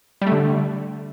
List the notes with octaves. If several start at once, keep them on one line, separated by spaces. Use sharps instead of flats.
G3
A3
D3